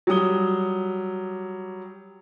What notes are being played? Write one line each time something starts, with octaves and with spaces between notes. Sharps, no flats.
F#3 G3 D#6 G7